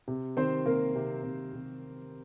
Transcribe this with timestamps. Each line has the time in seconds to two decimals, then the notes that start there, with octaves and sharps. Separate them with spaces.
0.08 C3
0.37 D#3 C4 C5
0.66 C3 A#3 A#4
0.95 C3
1.23 C3
1.53 C3